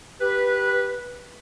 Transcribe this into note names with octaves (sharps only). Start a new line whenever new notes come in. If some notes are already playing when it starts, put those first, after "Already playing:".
G4 B4